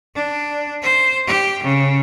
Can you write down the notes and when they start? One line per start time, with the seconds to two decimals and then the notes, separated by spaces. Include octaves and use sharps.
0.15 D4
0.82 C5
1.27 G4
1.63 C#3